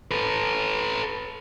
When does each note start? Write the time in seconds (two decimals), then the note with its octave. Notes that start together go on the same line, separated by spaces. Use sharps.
0.11 A4 B4